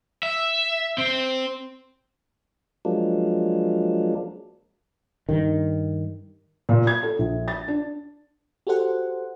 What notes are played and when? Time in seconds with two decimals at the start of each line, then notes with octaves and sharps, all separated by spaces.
0.23 E5
0.98 C4
2.85 F3 F#3 G#3 A#3 D4
5.29 G2 D#3
6.69 A#2
6.87 G#6
7.03 A4
7.19 A#1
7.48 A6
7.68 D4
8.67 F#4 G4 A4 C5 F#5